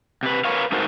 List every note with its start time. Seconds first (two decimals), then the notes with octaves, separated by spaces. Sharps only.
0.23 C3 B4
0.45 A#4 B4 C#5 F5
0.72 G#3 A3 D#4 F#4 A#4 C5